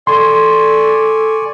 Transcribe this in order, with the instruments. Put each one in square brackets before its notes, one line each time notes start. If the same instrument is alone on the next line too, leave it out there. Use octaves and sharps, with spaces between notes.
[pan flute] A4 [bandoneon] D5 G#5 C#6 [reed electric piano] C6